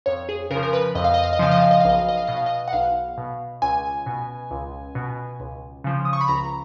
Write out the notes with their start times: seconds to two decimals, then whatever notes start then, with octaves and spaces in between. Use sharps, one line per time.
0.06 F2 C#5
0.29 G#4
0.50 C#3 A#4
0.55 F3
0.63 A#4
0.73 B4
0.95 F2 D#5
1.04 F5
1.14 D#5
1.24 F5
1.33 D#5
1.39 C#3 F3 F5
1.51 D#5
1.61 F5
1.71 D#5
1.80 B1 F5
1.89 D#5
1.99 F5
2.09 D#5
2.17 F5
2.27 B2 D#5
2.37 F5
2.46 D#5
2.68 F#5
2.73 B1 F5
3.17 B2
3.62 C#2 G#5
4.06 B2
4.51 C#2
4.95 B2
5.40 C#2
5.84 C#3 F3
6.05 D#6
6.13 C#6
6.21 B5
6.28 C#2 A#5